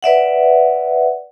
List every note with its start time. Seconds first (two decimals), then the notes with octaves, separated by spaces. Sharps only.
0.03 B4 D5 E5 F#5